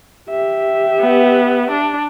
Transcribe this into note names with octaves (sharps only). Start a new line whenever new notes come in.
G4 E5
B3
D4